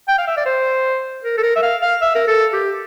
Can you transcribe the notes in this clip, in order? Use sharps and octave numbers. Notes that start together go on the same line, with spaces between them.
G5
F5
E5
D5
C5
A#4
A4
A#4
E5
F5
F5
E5
A#4
A4
G4